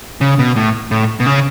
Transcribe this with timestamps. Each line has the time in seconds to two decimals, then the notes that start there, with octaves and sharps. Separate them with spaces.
0.21 C#3
0.39 B2
0.56 A2
0.91 A2
1.20 B2
1.26 C#3